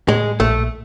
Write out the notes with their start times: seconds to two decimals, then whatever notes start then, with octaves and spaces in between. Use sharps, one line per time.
0.08 A2 G#3
0.40 A#1 A3